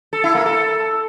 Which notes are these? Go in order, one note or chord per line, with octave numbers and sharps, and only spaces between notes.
A4
E4
A#3
A4